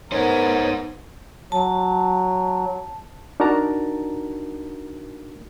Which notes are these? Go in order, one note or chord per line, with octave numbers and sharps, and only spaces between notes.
B3 D#4 A#4 C5 C#5
F#3 A5
D4 D#4 F#4 A#4 A5 A#5